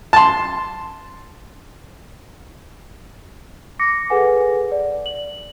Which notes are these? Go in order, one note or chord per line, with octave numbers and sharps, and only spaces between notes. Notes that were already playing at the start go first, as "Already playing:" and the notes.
A5 C6
D6 A#6 C#7
G#4 A4 B4 F#5 G#5
D5
F#7